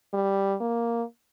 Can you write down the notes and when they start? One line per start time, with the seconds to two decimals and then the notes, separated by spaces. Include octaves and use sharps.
0.13 G3
0.61 A#3